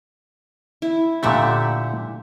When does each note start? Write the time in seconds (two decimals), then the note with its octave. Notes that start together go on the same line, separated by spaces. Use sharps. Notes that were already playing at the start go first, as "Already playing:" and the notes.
0.82 E4
1.23 A#2 D3 A3 G4 E5 F#5